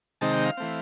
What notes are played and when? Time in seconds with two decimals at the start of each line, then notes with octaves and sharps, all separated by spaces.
0.21 C3 D#3 G#3 C4 D#4 A5
0.33 G5
0.45 F5
0.57 E3 A3 C4